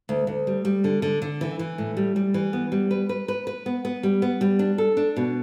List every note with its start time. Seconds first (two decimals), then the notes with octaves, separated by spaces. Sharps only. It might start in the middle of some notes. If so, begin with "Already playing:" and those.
0.09 D2
0.27 D2
0.47 G3
0.65 G3
0.84 D3
1.02 D3
1.22 D3
1.41 E3
1.59 E3
1.78 A2
1.97 G3
2.16 G3
2.34 E3
2.53 B3
2.72 G3
2.91 B4
3.09 B4
3.28 B4
3.47 B4
3.66 B3
3.85 B3
4.03 G3
4.22 B3
4.41 G3
4.59 D4
4.78 A4
4.97 D4
5.17 B2